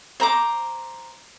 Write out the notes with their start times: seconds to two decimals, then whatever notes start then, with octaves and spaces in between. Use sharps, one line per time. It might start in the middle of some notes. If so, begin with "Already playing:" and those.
0.20 C5 A#5 D6